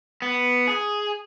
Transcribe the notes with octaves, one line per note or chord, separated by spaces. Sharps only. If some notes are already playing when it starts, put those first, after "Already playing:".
B3
G#4